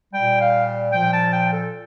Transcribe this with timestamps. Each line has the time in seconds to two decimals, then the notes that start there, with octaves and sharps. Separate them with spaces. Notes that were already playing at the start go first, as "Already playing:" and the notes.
0.13 A#2 G3 G5
0.40 F5
0.93 A#2 F3 G5
1.13 A5
1.33 G5
1.53 A4